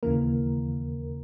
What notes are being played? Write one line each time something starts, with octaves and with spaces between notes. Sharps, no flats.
D#2 C#3 E3 A#3 A#4